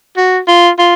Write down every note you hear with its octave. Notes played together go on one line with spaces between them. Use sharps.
F#4
F4
F4